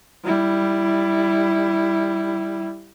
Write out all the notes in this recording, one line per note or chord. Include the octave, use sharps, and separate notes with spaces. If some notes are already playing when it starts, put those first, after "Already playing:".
G3 E4